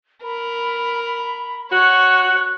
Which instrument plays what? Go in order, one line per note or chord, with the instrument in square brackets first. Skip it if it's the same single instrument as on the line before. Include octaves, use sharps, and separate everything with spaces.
[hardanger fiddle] A#4 [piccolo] B5
[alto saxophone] F#4 [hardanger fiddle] C#5 [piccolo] F#6